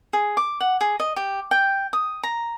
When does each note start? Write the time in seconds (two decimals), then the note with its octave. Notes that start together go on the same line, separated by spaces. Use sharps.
0.13 G#4
0.37 D6
0.60 F#5
0.81 G#4
1.00 D#5
1.16 G4
1.51 G5
1.93 D#6
2.23 A#5